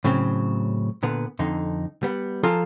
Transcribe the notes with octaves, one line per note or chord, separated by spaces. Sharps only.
A2 C#3 F#3 C4
A#2 D3 B3
F2 D3 D#4
G3 B3
F3 F4 G#4 A4 A#5